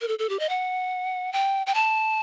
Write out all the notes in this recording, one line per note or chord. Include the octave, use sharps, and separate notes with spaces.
A#4
A4
A4
G4
D#5
F#5
G5
G5
A5